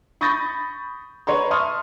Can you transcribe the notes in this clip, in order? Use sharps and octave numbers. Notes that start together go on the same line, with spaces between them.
B5 C#6 D#6 G6 A6 A#6
B4 C#5 A#5 C6
E5 A5 C6 C#6 D#6 F6